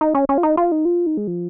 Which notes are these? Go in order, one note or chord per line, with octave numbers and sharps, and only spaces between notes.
D#4
C#4
C#4
F4
D#4
F4
D#4
F4
D#4
G#3
F3